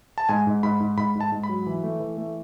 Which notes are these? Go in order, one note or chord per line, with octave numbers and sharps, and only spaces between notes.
A5
G#2 G#5
G#2
G#2 B5
G#2
G#2 B5
G#2
A5
G#2
B5
F#3
E3
A3
E3
A3